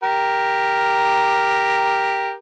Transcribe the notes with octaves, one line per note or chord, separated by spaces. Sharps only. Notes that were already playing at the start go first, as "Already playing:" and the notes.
G4 A#4